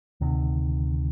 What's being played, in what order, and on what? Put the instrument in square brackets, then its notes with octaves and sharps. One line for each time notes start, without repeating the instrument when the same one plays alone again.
[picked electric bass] D2 C3 D#3